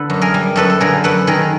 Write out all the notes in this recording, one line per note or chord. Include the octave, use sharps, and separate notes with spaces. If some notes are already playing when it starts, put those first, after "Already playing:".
Already playing: D3 A4 B4
F#2
G#4 A#4
G3
F#2 A4 B4
A4
D3 G#4 A#4
F#2 A4 B4
D#3 G#4 A#4